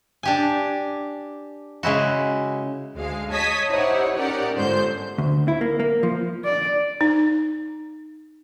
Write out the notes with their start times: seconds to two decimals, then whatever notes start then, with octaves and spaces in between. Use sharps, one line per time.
0.23 D4 G4 G#5
1.83 C#3 G#3 E4 F#4
2.95 D2 G#3 F5
3.33 C#5 D#5 A5 D#6 G#6 B6
3.70 D#4 E4 G4 C5 C#5 F#5
4.17 C#4 D#4 G4 A#4 D5 F#5
4.55 G1 G#2 C5 G6
5.18 D2
5.48 E4
5.61 A#3
5.80 A#3
6.03 F3
6.45 D5
7.01 D#4